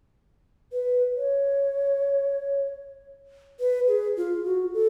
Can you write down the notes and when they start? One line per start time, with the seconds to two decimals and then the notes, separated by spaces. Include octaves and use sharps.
0.72 B4
1.16 C#5
3.60 B4
3.88 G#4
4.17 F4
4.45 F#4
4.74 A4